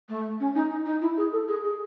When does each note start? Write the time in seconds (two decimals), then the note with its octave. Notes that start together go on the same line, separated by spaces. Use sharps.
0.09 A3
0.40 C#4
0.55 D#4
0.70 D#4
0.85 D#4
1.01 E4
1.17 G#4
1.33 A4
1.48 G#4
1.64 G#4